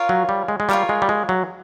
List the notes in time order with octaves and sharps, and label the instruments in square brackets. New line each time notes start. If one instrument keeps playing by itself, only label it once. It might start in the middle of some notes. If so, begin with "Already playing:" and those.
Already playing: [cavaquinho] F4 A#4 C#5 F5
[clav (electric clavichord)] F#3
G3
G#3
G#3
[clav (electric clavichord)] G3 [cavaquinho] F4 A#4 C#5 F5
[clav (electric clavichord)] G#3
G3
G#3
F#3